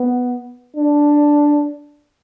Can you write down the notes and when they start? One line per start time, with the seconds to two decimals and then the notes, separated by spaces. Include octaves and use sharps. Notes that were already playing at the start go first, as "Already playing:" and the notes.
Already playing: B3
0.77 D4